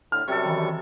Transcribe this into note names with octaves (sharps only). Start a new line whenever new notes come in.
A2 D3 F6
F#2 C3 G3 A4 C#6
D#3 E3